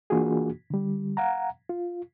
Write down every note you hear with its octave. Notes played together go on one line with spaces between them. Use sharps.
E3 A#3 D4 F4 F#4 G#4
D3 G3
F5 F#5 A#5
F4